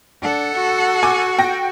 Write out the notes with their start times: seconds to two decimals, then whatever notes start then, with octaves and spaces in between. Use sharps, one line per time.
0.23 D4 A4 F#5
0.55 F#4
1.03 G#5 D6
1.39 G5 A#6